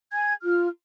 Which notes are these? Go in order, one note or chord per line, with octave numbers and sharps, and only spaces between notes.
G#5 G#6
F4 F6